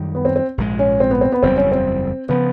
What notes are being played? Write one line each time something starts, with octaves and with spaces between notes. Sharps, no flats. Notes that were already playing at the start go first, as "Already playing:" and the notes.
Already playing: F#2 D#3 G3
B3
C4
C4
A#1 G#2 D#3 G#3
C#4
C4
B3
C4
B3
F#1 E2 B2 G3 C4
C#4
C4
C#3 F3 B3